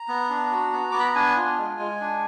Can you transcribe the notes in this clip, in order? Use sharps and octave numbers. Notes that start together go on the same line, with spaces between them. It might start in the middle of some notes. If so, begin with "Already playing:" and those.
Already playing: A#5
B3
D4
F#4
B3
B3 D6
B5
A#5
D4 G#5
F4
G#3
G#3
D4